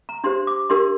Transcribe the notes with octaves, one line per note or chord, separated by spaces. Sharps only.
A#5
D4 G4 C5 C6
D6
D4 G4 A#4 C6